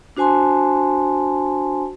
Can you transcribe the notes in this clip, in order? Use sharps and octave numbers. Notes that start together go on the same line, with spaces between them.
D4 F#4 C5 G#5 A5 C6